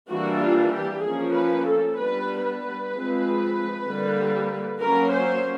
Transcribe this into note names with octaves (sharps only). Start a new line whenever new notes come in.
E3 G3 A#3 D4 F#4
F4
G4
F3 A#3 C#4 G#4
B4
A4
G3 B3 D4 B4
B4
F3 G#3 C4
D3 G3 A#3
F#3 A#3 C#4 A#4
C5